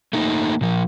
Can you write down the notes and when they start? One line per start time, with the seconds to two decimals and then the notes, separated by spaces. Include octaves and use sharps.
0.13 A3 A#3 D#4
0.61 A#2 F3